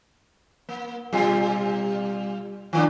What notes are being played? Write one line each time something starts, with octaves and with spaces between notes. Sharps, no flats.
A#3
B2 G3 F4
D#3 A#3 D4